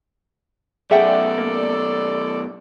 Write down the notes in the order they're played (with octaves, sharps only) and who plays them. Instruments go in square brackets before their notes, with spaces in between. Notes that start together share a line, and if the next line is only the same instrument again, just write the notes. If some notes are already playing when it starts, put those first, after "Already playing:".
[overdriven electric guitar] F#2 B2 [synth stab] G#4 G5 [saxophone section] A4 D5 [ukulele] E5 F#5
[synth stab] A#3